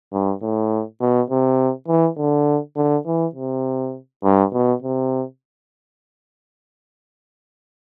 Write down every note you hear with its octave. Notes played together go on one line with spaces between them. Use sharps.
G2
A2
B2
C3
E3
D3
D3
E3
C3
G2
B2
C3